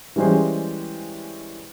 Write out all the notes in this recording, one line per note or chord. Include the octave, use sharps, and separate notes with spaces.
E3 G3 G#3 C#4 C5